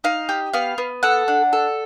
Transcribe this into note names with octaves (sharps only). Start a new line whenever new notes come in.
D#4 F5
G4
B3 F5
B3
A4 F#5
D4
A4